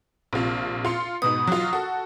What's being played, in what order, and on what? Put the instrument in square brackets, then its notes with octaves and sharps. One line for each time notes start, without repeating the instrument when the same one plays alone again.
[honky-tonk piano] A#1 C3 F4
F4 C6 C#7
[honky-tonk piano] G#2 B2 B3 [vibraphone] D#6
[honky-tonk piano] F#3 F4
F#4 A4